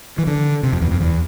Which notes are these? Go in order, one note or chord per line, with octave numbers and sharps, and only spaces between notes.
E3
D3
C3
F2
E2
F2
E2